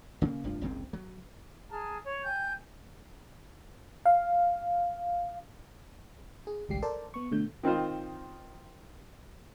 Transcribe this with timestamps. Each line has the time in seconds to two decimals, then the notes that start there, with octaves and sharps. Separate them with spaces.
0.22 C#3 A#3
0.44 F1 G2 F3
0.61 F#1 C2 G#2 C4
0.93 F#3
1.70 G#4 A5 A#5 F6
2.04 C#5
2.24 G5 G#5 G6
4.06 F5
6.47 G#4
6.69 G#1 C#2 G3 G4 C7
6.82 A4 A#4 C5 D5 A5
7.14 B3 C#6
7.31 B2 D3 A3 G6
7.63 D#3 C4 D#4 F4 C5